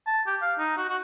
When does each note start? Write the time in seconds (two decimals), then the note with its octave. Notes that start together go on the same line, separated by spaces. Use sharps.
0.07 A5
0.27 G4
0.42 F5
0.59 D#4
0.77 F#4
0.89 F#4